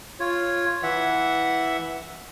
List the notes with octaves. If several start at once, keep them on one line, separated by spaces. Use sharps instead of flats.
F4 C#5
E3 E5 F#5